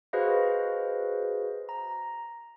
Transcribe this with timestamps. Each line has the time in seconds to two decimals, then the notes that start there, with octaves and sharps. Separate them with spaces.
0.13 F#4 G#4 B4 C5 D#5 F5
1.69 A#5